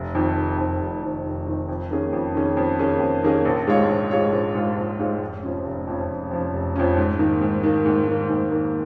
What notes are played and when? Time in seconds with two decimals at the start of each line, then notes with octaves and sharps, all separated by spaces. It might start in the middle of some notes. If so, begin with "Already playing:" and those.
Already playing: F1
0.15 F2 D#3
0.36 F1
0.58 F2 D#3
0.80 F1
1.02 F2 D#3
1.24 F1
1.47 F2 D#3
1.69 F2
1.90 D#3 A#3 C#4 G#4
2.13 F2
2.35 D#3 A#3 C#4 G#4
2.57 F2
2.79 D#3 A#3 C#4 G#4
3.00 F2
3.23 D#3 A#3 C#4 G#4
3.45 A#1
3.67 G#2 G#3 F4 C#5
3.89 A#1
4.11 G#2 G#3 F4 C#5
4.33 A#1
4.54 G#2 G#3 F4 C#5
4.77 A#1
4.99 G#2 G#3 F4 C#5
5.21 F1
5.43 F2 F3 C#4
5.64 F1
5.87 F2 F3 C#4
6.09 F1
6.31 F2 F3 C#4
6.53 F1
6.76 F2 F3 C#4
6.97 G#2
7.19 D#3 A#3
7.41 G#2
7.63 D#3 A#3
7.86 G#2
8.08 D#3 A#3
8.29 G#2
8.51 D#3 A#3